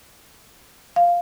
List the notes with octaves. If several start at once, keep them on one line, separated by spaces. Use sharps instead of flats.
F5